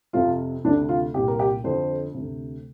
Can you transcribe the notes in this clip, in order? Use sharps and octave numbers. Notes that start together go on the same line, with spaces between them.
F2 C3 F4
D2 C3 D4
F4
C2 A#2 G4
A#4
G4
F2 D3 C5
D2 C3